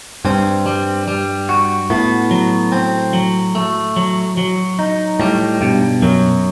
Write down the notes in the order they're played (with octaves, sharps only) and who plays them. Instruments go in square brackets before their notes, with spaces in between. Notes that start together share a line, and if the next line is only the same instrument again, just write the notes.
[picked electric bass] G2 [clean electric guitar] C4
[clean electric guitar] G3
G3
F#4
[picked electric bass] A2 [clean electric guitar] B3
[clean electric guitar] F#3
C4
F#3
A3
F#3
F#3
D#4
[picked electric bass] A2 [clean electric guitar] G3
[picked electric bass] G2 [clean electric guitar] B2
[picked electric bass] F#2 [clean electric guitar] F#3